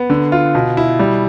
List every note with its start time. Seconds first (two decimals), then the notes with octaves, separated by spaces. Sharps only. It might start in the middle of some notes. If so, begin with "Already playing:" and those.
Already playing: B3
0.10 D3
0.32 F4
0.55 B2
0.77 E4
0.99 G3